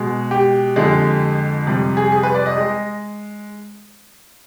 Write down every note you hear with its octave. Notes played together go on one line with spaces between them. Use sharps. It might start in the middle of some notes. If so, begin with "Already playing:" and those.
Already playing: B2 G#3
G4
F2 D3 G#3
F2 C3 G3
G#4
G#4
B4
D5
D#5
G#3